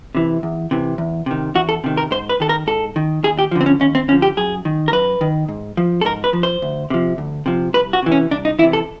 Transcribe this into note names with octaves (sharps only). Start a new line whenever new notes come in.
C3 E3
E2
C3 E3
E2
C3 D#3
E2 F#4
A4
C3 D#3
A#4
G#2 C5
B4
D#3 A4
A#4
G#2 A4
D#3
D#2 G#4
G4
D3 F3
C4
C#4
D#2 C#4
C4
D3 F3 C#4
G4
F#2 G#4
D#3
A#4
F#2 B4
D#3
G#2
F3
A4
G#2 A#4
B4
F3
C5
D2
C3 F3
D2
C3 F3
C2 B4
F#4
C3 E3
C#4
C2 D4
D#4
C3 E3 E4
A4